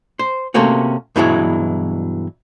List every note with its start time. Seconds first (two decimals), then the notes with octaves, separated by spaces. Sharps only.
0.19 C5
0.54 C3 A3 A#3 C#4 F#4
1.16 G2 B2 E3 F#3 G#3 E4